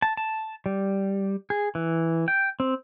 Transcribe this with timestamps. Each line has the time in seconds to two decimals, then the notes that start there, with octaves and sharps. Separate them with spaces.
0.02 A5
0.17 A5
0.66 G3
1.50 G#4
1.75 E3
2.28 G5
2.60 C4